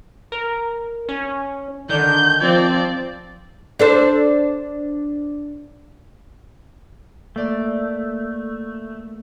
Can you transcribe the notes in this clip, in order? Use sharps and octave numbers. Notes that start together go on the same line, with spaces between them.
A#4
C#4
D3 D#3 D4 G6
F3 C4 D5
D4 A4 C5
A3 A#3 D5